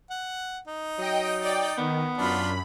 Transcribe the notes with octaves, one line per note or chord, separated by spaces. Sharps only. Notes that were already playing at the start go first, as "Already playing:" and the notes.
F#5
D#4
F#3 D#5 G5
D5 G5
D#3 B3
F#2 D4 F4 B5